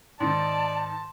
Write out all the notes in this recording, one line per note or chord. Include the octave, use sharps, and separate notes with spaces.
G#2 D#3 D5 A5 C6